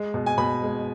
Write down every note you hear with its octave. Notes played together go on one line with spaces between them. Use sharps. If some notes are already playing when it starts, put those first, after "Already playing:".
Already playing: G#3
B2
G#5
B2 B5
G#3